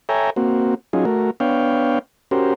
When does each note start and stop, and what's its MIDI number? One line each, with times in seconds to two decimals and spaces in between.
0.09 0.30 69
0.09 0.30 73
0.09 0.30 76
0.09 0.30 79
0.09 0.30 80
0.09 0.30 82
0.36 0.75 58
0.36 0.75 60
0.36 0.75 66
0.93 1.05 54
0.93 1.05 61
0.93 1.05 63
0.93 1.05 65
0.93 1.05 68
1.05 1.31 57
1.05 1.31 66
1.05 1.31 70
1.40 1.99 59
1.40 1.99 62
1.40 1.99 73
1.40 1.99 77
1.40 1.99 79
2.31 2.54 61
2.31 2.54 66
2.31 2.54 67
2.31 2.54 70
2.31 2.54 72